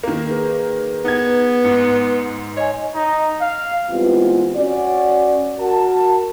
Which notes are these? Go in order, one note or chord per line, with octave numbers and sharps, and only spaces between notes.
D#3 A#3
G#4 B4
B3 D#4 G#6
G#2 C#7
C#5 D#5 G#5
D#4
F5
E3 G3 G#3 B3 C4 F4
C#4 F#4 D5
F#4 A#4 A5